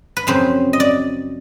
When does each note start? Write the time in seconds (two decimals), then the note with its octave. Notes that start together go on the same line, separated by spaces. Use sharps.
0.17 B4
0.27 F#2 C#3 F3 C4 C5
0.73 D#5
0.80 D5